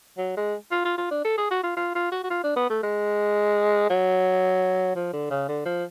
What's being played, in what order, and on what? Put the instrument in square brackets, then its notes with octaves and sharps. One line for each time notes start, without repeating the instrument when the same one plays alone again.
[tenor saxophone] F#3
G#3
F4
F4
F4
D4
A4
G#4
F#4
F4
F4
F4
F#4
F#4
F4
D4
B3
A3
G#3
F#3
F3
D3
C#3
D3
F3